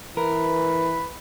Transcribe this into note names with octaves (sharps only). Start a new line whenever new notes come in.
E3 A#4 B4